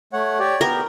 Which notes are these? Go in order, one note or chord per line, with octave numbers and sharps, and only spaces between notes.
A3 C#5 F#5
G4 C#5 D5
B3 G4 A#4